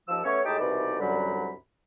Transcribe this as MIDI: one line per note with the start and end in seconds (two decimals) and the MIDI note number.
0.08 0.19 39
0.08 0.19 53
0.08 0.19 88
0.24 0.41 57
0.24 0.41 59
0.24 0.41 61
0.24 0.41 73
0.45 0.57 45
0.45 0.57 56
0.45 0.57 63
0.45 0.57 67
0.45 0.57 79
0.45 0.57 81
0.59 0.97 36
0.59 0.97 47
0.59 0.97 52
0.59 0.97 63
0.59 0.97 74
1.00 1.52 36
1.00 1.52 42
1.00 1.52 50
1.00 1.52 54
1.00 1.52 55
1.00 1.52 83